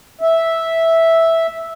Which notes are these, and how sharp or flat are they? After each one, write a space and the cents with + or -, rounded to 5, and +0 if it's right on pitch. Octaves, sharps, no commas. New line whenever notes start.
E5 -5